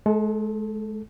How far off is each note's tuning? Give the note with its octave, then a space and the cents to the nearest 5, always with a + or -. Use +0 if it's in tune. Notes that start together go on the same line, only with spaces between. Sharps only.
G#3 +40 A4 +0